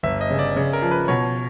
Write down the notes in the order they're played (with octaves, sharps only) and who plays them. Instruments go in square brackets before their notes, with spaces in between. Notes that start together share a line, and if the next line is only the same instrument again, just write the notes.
[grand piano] G1 [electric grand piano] E5
[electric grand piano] D#5
[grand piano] C#3
[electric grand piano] D5
[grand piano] C#3
[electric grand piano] A#4
[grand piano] F3
[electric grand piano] B4
[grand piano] B2 [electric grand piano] C#5